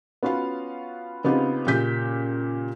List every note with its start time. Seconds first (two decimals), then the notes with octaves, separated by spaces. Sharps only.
0.23 B3 C#4 F4 F#4 F5 F#5
1.24 C#3 B3 C4 D#4 F4 G4
1.67 A#2 C#3 G4 G6 B6